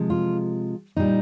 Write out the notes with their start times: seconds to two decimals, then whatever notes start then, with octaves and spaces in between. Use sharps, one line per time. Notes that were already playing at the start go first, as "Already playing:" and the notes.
Already playing: C3 F3 G#3
0.10 F4
0.96 A#2 G3 D#4